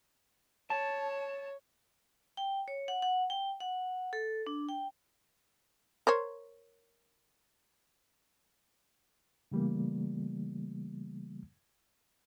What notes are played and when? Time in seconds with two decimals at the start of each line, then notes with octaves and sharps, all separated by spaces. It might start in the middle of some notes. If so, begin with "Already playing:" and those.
0.70 C#5 A5
2.37 G5
2.68 C#5
2.88 F#5
3.02 F#5
3.30 G5
3.60 F#5
4.13 A4
4.47 D4
4.69 G5
6.07 A#4 C5 C#5
9.52 C#3 E3 G3 A3 A#3